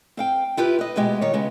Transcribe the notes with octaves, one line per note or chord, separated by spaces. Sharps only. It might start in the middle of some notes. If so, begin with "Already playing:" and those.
C4 F5 G5
E4 F4 G4 B4
B4 D#5
D2 B2 G#3 G4
D#3 C#5
C#3 G#3 B3